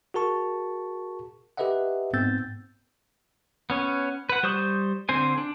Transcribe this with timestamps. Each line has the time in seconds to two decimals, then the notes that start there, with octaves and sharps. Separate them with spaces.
0.14 F#4 G#4 A#4 A5 C#6
1.57 G4 A4 B4 D#5 E5 F#5
2.13 G#2 B3 C4 E6 G6 A6
3.70 B3 C#4 C#5
4.29 B4 F#5
4.43 G3 C5 C#6 D#6 G6
5.09 D3 C4 C5 G#5
5.38 D4